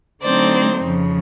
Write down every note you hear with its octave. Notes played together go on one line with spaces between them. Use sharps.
D3 F#3 A3 C4 D#4 C5 D5
F2 C#3 F3